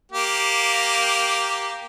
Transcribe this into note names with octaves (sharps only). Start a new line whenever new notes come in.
A#3 G4